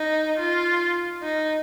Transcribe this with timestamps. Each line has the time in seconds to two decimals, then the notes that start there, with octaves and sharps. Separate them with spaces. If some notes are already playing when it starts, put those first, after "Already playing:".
Already playing: D#4
0.38 F4
1.23 D#4